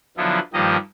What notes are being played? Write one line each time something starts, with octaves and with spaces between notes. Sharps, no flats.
D3 F3 F#3 B3 E4 F4
G2 D#3 F3 A#3 G4 D#5